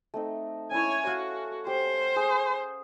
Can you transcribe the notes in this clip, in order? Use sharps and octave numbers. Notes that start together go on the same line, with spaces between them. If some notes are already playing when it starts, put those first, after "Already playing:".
A3 C4 D#4
C#4 E4 C#5 G#5
F#4 C#5 F5 F#5
G4 C5
G#4